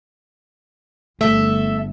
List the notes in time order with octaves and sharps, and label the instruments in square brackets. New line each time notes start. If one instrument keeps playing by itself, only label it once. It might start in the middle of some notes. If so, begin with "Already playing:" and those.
[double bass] G1 [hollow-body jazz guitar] A3 [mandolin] A4 E5